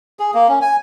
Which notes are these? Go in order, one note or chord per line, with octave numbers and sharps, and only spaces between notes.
G#4
A#3
C#4
G#5